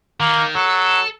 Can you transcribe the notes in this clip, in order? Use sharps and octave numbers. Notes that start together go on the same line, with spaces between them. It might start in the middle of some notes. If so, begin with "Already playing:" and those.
D#3 A#3
F#3 A4